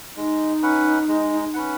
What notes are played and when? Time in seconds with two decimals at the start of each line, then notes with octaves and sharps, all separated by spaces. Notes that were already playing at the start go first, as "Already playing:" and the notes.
0.16 G#3 D#4
0.62 C#4 B4 F#5
1.08 G#3
1.54 C#4 B4 F#5